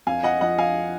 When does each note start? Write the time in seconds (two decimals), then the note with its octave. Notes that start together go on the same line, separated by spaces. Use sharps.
0.06 F2 F5 G#5
0.23 D#5 F#5
0.41 F3 D#5 F#5
0.58 F5 G#5